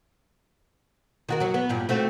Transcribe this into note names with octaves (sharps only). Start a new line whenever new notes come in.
D#3 F#4 A#4
F#3 F#4
B3
G2 A#2 G3
A3 C4 F#4